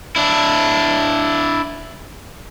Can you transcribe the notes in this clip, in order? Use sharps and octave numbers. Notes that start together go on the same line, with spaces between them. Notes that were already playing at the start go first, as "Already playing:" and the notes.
D4 E4